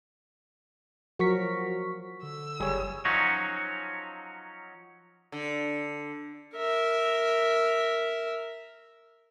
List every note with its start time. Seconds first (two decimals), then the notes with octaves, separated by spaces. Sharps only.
1.19 F3 F#3 F#4 A#4 C#6 B6
2.23 D3 E6
2.60 F#1 G3 G#4 C#5
3.05 F3 F#3 C#4 D#4 F#4
5.32 D3
6.55 A#4 E5